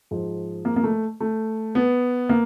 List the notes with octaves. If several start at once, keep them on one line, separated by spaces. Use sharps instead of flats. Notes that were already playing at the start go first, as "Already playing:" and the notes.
G#2 F3
A#3
A#3
A3
A3
B3
A#3